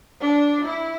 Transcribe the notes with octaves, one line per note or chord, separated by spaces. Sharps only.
D4
E4